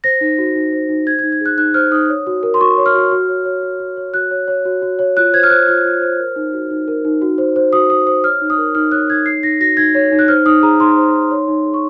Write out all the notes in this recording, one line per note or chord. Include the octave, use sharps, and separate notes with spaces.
C5 A#6
D#4
F#4
D#4
C5
D#4
C5 G#6
D#4 G#6
G#6
G#4
F#6
D#4 F#6
C5 F6
D#4 D#6
C#5
F#4
A#4
C6
F#4 C#6
C#5
F6
F#4
F#4
C#5
C#5
F#4
F#4
C#5
F#4 F#6
C#5
C#5
F#4
F#4
C#5
F4 F#6
C5 G#6
F6
C5 F#6
F4 F6
F4
C5
A#4
D#4
F#4
D#4
A#4
D#4
F#4
C5
C5
F#4 D#6
F#4 D#6
C5 D#6
C#5 F6
D#4
D#6
A#4
D#4 F6
C#5 F#6
D#4 G#6
C#5 C7
D#4 A#6
F#4 A#6
D#4 G#6
C#5
D#4
F#6
C5 F6
D#4 D#6
G#4 A#5
D#4 C6
C5
D#4
C#5
D#4
G#4
C#6